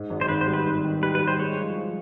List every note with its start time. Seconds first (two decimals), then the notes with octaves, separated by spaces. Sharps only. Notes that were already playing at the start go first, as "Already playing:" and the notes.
Already playing: G#2
0.10 G#1
0.21 C5
0.28 G#1 B4
0.41 C5
0.47 G3
0.54 B4
0.66 G#1
0.84 D#3
1.02 G3 B4
1.15 B4
1.21 G3
1.28 C5
1.39 G#3 C#5
1.58 F3
1.77 F3